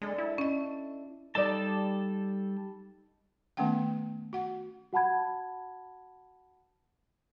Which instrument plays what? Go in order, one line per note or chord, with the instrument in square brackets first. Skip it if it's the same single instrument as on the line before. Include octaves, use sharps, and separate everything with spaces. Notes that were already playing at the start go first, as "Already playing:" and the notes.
[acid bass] G#3 [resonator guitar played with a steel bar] D4 A4
[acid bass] E4
[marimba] C#4 D#5
[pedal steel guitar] G3 A4 A5 [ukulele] D#4 D5
[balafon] D#3 A3 B3 C#4 F#5 G5
F#4 F#5
[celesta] F#4 F#5 A5 B5 G#6